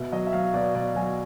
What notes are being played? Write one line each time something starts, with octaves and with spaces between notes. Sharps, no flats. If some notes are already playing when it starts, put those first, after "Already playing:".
Already playing: B2 E5
F#3 D#5
E5
F#3 F5
B2 D5
B2 D5
F#3 G#5